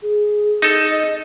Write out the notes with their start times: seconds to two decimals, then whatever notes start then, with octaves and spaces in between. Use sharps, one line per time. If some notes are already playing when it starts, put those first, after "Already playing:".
0.02 G#4
0.62 D#4 A4
0.91 D#5